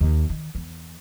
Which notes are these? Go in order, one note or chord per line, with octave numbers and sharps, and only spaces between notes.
D#2
D#3
E2